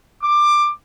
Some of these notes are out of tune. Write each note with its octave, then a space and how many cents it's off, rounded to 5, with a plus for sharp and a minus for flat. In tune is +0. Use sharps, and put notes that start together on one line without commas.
D6 +15